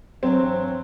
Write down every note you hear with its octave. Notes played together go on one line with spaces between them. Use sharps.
G2 E3 F#3 C4